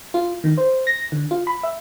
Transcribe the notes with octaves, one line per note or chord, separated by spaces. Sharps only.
F4
D#3
C5
A#6
D3
F4
B5
E5